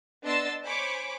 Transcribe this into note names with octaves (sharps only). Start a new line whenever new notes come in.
B3 D4 D#5 C6 E6 A6
C5 C#5 G#5 B5 D6